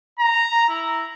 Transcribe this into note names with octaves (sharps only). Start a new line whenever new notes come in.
A#5
E4